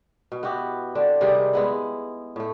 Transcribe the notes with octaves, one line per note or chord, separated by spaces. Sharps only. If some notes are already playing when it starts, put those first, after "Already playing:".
B2
B3 E4 F#4 G4
D3 C4 D4
C3 D#3 G3 G#4
G#3 B3 E4
A2 A3